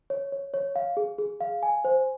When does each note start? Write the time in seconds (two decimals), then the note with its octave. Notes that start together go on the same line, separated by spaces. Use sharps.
0.10 C#5
0.32 C#5
0.54 C#5
0.76 F5
0.97 G#4
1.18 G#4
1.41 F5
1.63 G#5
1.85 C5